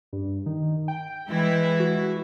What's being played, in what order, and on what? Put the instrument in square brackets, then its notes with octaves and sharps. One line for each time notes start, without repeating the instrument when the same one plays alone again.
[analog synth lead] G2
D#3
G5
[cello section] E3 G#3 E4
[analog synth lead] F#4